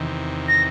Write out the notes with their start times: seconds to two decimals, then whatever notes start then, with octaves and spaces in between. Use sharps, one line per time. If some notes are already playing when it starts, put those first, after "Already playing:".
Already playing: E2 C3 D#3
0.48 A#6